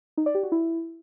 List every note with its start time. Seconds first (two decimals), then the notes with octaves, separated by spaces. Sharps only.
0.17 D#4
0.26 D5
0.35 G4
0.43 F#4
0.52 E4